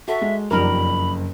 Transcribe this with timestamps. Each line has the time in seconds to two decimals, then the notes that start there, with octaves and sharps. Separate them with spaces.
0.08 F#4 A4 E5
0.21 G#3
0.51 F#1 F2 G3 D#4 A#4 B5